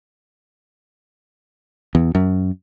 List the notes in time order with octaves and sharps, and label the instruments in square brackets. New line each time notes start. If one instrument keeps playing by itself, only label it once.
[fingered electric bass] E2
F#2